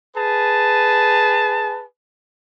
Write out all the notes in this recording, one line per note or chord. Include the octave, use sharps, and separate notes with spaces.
G#4 B4 A5